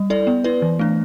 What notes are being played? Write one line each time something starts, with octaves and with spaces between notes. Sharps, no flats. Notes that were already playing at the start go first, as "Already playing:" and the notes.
Already playing: G3
E4 A4 D5
B3
E4 B4 D5
E3
A3 D4